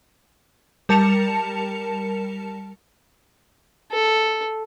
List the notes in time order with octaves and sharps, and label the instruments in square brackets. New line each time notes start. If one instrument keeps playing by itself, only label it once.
[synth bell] G3 A#4 A5 C#7 E7 F7
[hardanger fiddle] A4